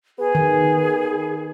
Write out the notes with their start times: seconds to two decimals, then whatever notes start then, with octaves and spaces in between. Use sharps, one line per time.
0.19 B3 G#4
0.35 D#3